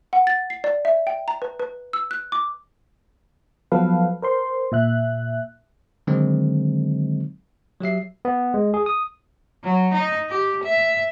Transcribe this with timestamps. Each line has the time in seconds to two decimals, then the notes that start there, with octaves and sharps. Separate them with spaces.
0.13 F#5
0.27 A6
0.50 C7
0.64 D5
0.85 E5
1.07 G5
1.28 A#5
1.42 B4
1.60 B4
1.93 E6
2.11 F#6
2.32 D6
3.72 F3 F#3 B3 A4 B4 F5
4.22 A#4 C5 C6
4.72 A#2 E5 F#6
6.07 D3 D#3 F#3 G#3 C4 D#4
7.81 F#3 G4 E5 C7
8.25 B3
8.54 G#3
8.74 G#4
8.86 D#6
9.64 F#3
9.93 D#4
10.29 G4
10.63 E5